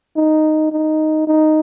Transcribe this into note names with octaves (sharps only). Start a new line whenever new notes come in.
D#4
D#4
D#4